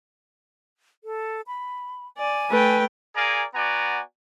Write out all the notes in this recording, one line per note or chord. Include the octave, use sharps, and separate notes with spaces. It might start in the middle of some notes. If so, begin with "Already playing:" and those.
A4
B5
D5 G#5
A3 B4 G5
G#4 A#4 D5 F5 G#5 A#5
B3 F#4 D5 F#5 G#5 A#5